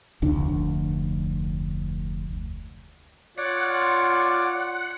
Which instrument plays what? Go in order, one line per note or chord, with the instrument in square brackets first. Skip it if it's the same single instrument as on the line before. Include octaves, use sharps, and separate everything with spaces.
[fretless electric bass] F1 D2 D4
[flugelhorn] F4 [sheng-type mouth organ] C#5 D5 D6 [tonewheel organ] F#5